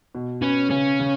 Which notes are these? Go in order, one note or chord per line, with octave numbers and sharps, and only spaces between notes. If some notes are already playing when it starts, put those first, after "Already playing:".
B2
C#4 B4
C#3 C#4
C#3